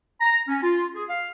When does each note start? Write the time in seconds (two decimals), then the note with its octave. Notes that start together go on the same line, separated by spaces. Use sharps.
0.21 A#5
0.48 C#4
0.63 F4
0.95 G#4
1.09 F5